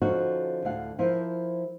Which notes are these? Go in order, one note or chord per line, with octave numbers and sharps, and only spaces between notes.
D3 F3 C#4 D#4 F#4
D2 A2 F5 F#5
F3 E4 A#4 C5